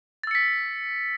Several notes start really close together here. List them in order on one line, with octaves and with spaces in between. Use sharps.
A6 E6 C#7 B6